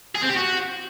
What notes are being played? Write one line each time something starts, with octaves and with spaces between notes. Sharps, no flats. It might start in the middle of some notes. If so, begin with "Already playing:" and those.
G#4
C4
G4
F#4